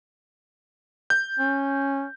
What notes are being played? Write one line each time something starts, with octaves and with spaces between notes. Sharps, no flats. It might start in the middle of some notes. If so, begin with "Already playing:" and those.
G6
C#4